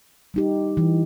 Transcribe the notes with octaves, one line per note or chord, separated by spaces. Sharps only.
G3 D#4 G4
E3